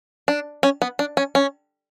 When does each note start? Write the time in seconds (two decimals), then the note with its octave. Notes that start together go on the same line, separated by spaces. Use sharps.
0.28 D4
0.63 C#4
0.82 B3
0.99 D4
1.17 C#4
1.35 C#4